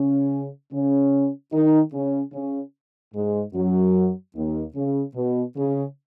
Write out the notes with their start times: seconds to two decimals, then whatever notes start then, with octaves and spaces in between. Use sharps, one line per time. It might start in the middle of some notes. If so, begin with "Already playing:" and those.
Already playing: C#3 C#4
0.72 C#3 C#4
1.52 D#3 D#4
1.93 C#3 C#4
2.33 C#3 C#4
3.14 G#2 G#3
3.53 F#2 F#3
4.34 D#2 D#3
4.75 C#3
5.15 B2
5.56 C#3